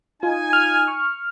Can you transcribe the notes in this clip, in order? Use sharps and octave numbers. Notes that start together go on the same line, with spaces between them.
D#4 F4 G#5
F6
C#6